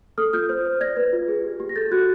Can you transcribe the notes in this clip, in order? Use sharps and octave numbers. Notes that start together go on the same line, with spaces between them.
A4 D#6 F6
F4 F6 G6
C5
C5
D5 G#6 A#6
B4
F4
G#4
G4
G4
A#6
A4 G6 A6
F#4 F#6 G#6